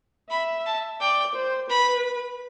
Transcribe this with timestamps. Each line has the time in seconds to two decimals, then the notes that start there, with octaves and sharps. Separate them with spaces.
0.30 E5 B5
0.66 A5
1.00 D5 G5
1.35 C5
1.69 B4 B5